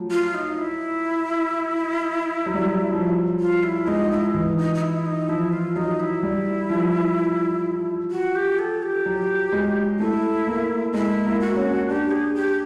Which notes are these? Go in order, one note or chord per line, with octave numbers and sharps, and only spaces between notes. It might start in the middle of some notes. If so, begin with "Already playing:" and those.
Already playing: F3 F#3 A3
F4
D#4
E4
F#3
G3
F#3
F3
F4
E4
G#3 D#4
E4
E3 D#4
D#4
D#4
E4
D#4
F3 E4
F4
F#3 D#4
E4
G3
F3
F#4
G4
A4
G4
F#3
G#3
A3 E4
A#3
G#3 E4
A#3
F#4
C#4
D4 G4
G#4
G4